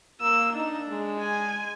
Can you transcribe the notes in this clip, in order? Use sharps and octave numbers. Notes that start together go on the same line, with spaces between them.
A#3 E6
D4 D#4
G#3
G#5